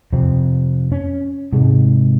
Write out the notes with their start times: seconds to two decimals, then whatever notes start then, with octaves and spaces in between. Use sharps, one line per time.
0.13 F2 C3 C4
0.92 C#4
1.53 G#2 C3 G#3